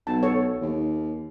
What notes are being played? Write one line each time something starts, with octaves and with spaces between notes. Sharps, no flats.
B1 A5
A4 C#5
D#2